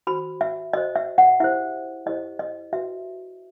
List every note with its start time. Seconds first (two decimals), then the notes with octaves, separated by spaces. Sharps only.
0.07 F#4 C5 B5
0.41 E5
0.73 F#4 D#5
0.77 C5
0.95 E5
1.18 F#5
1.40 E4 G4 C5 E5
2.06 E4 G4 C5 D#5
2.39 D#5
2.73 F#4 B4 E5